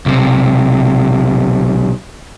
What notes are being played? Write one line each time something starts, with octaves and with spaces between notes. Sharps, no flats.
B1 C3